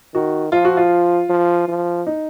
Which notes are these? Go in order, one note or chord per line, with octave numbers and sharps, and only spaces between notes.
D#3 F#4
F3 F4
F#4
F4
F3
F3
D#4